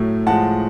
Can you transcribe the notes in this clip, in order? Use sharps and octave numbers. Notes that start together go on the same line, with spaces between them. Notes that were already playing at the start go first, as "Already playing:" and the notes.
Already playing: A2 F#3 A3
A2 F3 G#3 F#5 A5